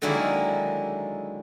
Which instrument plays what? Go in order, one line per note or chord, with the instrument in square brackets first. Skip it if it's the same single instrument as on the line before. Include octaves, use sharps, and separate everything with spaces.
[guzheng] D3 D#3 F#3 G#3 A#3 E4